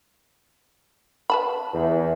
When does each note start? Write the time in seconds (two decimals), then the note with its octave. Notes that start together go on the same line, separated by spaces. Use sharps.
1.30 B4 A5 B5
1.74 E2